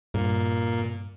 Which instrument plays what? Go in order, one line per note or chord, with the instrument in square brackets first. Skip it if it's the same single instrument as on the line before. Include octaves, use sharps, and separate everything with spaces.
[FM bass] G2 [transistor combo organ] A#2